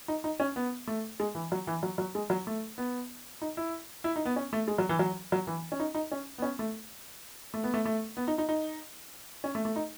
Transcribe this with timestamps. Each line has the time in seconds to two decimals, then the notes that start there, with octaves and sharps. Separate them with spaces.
0.08 D#4
0.24 D#4
0.40 C#4
0.56 B3
0.87 A3
1.20 G#3
1.35 E3
1.52 F#3
1.67 E3
1.83 F#3
1.98 F#3
2.15 G#3
2.30 F#3
2.47 A3
2.78 B3
3.42 D#4
3.57 E4
4.04 E4
4.16 D#4
4.25 B3
4.36 C#4
4.53 A3
4.68 G#3
4.78 F#3
4.89 E3
4.99 F#3
5.32 F#3
5.47 E3
5.72 C#4
5.80 D#4
5.95 D#4
6.12 C#4
6.38 B3
6.42 C#4
6.59 A3
7.54 A3
7.64 B3
7.74 A3
7.85 A3
8.17 B3
8.28 D#4
8.38 D#4
8.49 D#4
9.44 C#4
9.55 A3
9.65 A3
9.76 D#4